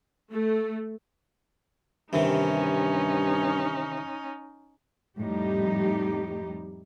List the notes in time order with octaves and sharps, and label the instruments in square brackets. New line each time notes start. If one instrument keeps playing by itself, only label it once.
[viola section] A3
[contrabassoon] G2 [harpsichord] C3 D#3 E3 [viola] C#4 D#4
[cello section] F2 A2 G3 D#4 G4